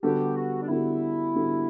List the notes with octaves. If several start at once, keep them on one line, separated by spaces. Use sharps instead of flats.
D3 G3 B3 F#4 G4 A4
F#4
D4
D3 G3 B3 E4 F#4 A4
D3 G3 B3 F#4 A4